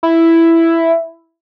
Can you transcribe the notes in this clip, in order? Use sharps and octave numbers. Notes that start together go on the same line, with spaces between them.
E4